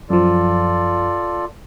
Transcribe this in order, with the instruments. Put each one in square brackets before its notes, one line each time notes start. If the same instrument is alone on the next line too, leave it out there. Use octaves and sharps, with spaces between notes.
[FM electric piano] F#2 F3 [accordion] F4 A4 D5